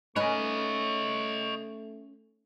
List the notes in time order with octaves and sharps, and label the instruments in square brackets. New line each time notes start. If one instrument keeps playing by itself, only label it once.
[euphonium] A3 [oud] C#4 D#4 B4 [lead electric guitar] C#5 D#5 [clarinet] C#6